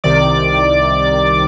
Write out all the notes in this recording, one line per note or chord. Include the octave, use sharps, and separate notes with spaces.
C2 C3 D#3 D5 D6